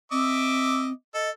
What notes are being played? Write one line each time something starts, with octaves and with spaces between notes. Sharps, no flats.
C4 D#5 E5 D6
A4 D#5